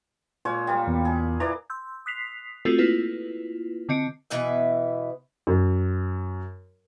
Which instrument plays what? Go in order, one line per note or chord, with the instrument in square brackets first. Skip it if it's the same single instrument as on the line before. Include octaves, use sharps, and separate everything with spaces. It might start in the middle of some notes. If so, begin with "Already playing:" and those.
[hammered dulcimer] A#2 G#3 C#5
G3 A#3
[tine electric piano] E2
[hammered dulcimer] G#4
[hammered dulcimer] E3 D5 [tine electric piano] A#5
[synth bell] C6 E6 G6
D#6 F#6 B6 C7 F7
A3 C4 F4 F#4 G#4 A4
A#3 E4 F4 B4
D3 C4 D#5 C#7 D7
[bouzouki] B2 E3 B4 E5
[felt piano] F#2